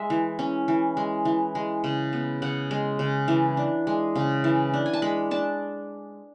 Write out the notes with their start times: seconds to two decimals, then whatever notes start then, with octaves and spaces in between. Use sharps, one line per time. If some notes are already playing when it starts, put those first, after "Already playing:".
Already playing: G#3 E5
0.10 E3
0.39 C#4
0.68 E3
0.97 G#3
1.25 E3
1.55 G#3
1.84 C#3
2.13 B3
2.42 C#3 F#5
2.71 G#3
2.99 C#3
3.28 E3
3.57 D4
3.87 G#3
4.16 C#3
4.44 E3
4.74 D4
4.86 G#5
4.93 A5
5.02 G#3 B5
5.31 D4 A5